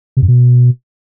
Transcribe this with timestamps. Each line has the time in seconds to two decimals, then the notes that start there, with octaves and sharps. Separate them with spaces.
0.17 C3
0.22 F#2
0.28 B2